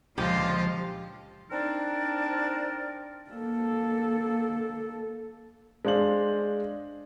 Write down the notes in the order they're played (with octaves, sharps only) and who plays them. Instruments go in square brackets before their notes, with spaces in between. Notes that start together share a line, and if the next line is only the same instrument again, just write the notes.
[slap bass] C#2 A#2 D3 [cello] F3 [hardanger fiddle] F4 D#5 [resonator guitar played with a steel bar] G4
[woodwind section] C4 D4 D#4 A#4 D5
[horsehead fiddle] A#3 A4
[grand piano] G#3 D4 C5 F5 F#7